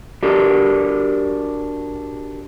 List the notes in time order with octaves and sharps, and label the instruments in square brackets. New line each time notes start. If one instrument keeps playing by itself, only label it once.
[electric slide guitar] D4 F#4 G4 A#4